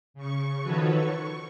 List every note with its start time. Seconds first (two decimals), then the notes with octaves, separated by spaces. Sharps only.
0.14 C#3 C#6
0.62 D#3 F3 F#4 A4 B4 C#5
0.93 C#6